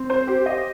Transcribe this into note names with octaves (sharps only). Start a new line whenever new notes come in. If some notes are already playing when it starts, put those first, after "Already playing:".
Already playing: C4
C5
G4
D#5